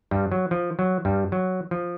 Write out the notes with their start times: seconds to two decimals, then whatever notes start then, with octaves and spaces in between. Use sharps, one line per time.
0.11 G2 G3
0.32 F#3
0.51 F3
0.79 F#3
1.05 G2 G3
1.32 F#3
1.71 F3